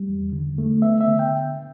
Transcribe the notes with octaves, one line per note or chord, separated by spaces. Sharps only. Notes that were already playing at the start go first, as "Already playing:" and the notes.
Already playing: G3
E2
D3
A3
B3 E5
E5
D3
G5